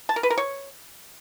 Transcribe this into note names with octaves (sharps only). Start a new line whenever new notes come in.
A5
A#4
B4
A#4
C#5